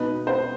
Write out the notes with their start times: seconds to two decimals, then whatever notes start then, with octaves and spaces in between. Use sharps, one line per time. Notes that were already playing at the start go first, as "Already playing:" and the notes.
Already playing: B2 B3 D#4 B4
0.27 C5